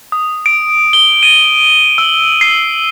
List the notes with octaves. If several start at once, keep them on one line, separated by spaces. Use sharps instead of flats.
D#6
D7
G7
D#7
E6
C7